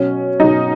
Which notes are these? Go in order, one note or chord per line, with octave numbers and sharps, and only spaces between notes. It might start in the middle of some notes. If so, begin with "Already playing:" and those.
Already playing: B2 F#3 C#4
B2 F#3 D#4